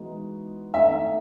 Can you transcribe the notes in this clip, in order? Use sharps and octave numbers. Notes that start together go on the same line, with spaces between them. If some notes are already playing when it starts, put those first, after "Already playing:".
Already playing: E3 G#3 B3 D#4 F#4
D#3 A3 D#4 E5